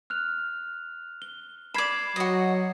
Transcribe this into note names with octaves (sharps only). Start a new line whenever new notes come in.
F6 F#6 F7
G7
D5 B5 G#6 C7 E7
F#3 F#4 D#5